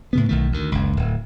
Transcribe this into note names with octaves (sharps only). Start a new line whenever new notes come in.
A2 C#3 B3
B1 D#3 A3
D2 D#3
F#1 C#2
D1